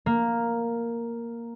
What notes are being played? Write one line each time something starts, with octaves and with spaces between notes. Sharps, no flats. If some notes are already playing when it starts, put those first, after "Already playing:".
A#3